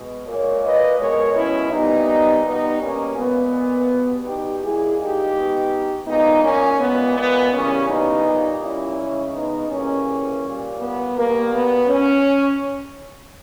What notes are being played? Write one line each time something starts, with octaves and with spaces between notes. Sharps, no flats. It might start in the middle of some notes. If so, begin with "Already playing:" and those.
Already playing: B2 G#3
A#2 G#3 A#4 C#5
B4 D#5
B2 G#3 A#4 C#5
C#4 E4
A#2 G3 B3 D#4
B2 G3 B3 D#4
A#3 C#4
A#2 G#3 B3
B2 G3
D#4 G4
A#2 G#3 E4 G#4
D#4 G4
B2 G#3
A#2 G#3 B3 D#4
A#3 C#4
A#2 G#3 B3
B3
C#3 E3 G3 A#3 C#4
B3 D#4
A#2 G3
C#4 E4
C#3 G#3
B3 D#4
C#3 E3 G3 A#3 C#4
A#2 G3
B3
B2 G3 A#3
B3
C#4